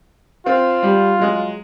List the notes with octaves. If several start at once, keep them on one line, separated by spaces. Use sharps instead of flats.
C4 F4
G3
F#3 G#3